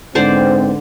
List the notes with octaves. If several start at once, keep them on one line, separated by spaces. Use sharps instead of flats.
G#2 D3 B3 C4 C5 D5